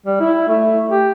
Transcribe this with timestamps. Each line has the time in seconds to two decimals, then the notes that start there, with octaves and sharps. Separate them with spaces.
0.06 G3
0.20 E4
0.48 A3
0.91 G4